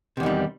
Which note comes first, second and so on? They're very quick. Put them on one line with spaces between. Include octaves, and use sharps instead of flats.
C3 E2 D#3 G3